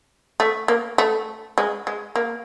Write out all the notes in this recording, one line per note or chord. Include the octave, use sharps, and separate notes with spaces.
A3
A#3
A3
G#3
G#3
A#3